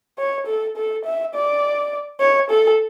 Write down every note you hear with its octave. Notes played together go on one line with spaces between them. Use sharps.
C#5
A4
A4
E5
D5
C#5
A4